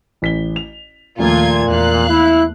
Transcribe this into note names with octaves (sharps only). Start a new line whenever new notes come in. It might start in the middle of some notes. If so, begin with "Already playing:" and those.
A1 B6 G7
F7
D#2 A#2 F3 A3 A#3 F4 G#6
E2 F5 F#6
E4